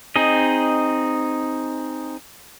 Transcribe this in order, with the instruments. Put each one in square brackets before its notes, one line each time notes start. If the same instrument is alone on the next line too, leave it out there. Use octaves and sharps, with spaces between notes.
[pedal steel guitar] C4 D#4 G#4 D#5